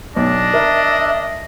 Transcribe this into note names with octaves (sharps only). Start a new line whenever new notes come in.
B1 D4 D#5
A#4 E5